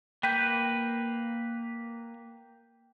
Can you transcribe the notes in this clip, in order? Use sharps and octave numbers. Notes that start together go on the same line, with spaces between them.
A#3 B4 G5 G6